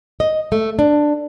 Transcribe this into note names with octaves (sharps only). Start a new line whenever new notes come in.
D#5
A3
D4